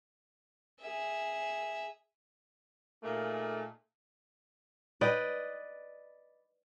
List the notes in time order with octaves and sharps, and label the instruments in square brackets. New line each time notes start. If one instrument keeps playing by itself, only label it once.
[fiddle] G#4 E5
[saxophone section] A#2 A3 A#3 D#4 G#4
[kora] B4 D5 D#5 G5